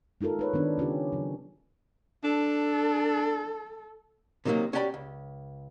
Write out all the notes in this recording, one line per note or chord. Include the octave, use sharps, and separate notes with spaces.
G#3 D#4 F4 A4 A#4
D#4 B4 C#5
D#3 B3 D4
C#3 C#4 F4 G4
C#3 F#3
D4 A4
C3 D#3 F#3 A3 A#3 C4
C#4 F#4 G4 D5 G#5 B5
C#2